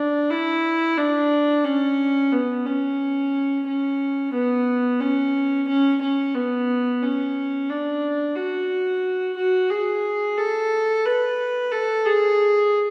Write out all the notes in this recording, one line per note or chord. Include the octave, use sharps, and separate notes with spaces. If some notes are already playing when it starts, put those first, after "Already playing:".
Already playing: D4
E4
D4
C#4
B3
C#4
C#4
B3
C#4
C#4
C#4
B3
C#4
D4
F#4
F#4
G#4
A4
B4
A4
G#4